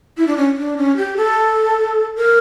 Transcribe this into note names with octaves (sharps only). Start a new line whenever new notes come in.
E4
D4
C#4
D4
C#4
G4
A4
A#4